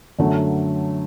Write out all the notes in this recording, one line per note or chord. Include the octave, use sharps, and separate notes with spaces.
F#2 D3 F#3 A3